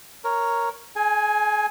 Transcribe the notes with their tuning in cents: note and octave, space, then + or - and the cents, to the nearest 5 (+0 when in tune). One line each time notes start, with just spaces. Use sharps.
A#4 +0 C#5 +0
G#4 +35 G#5 +0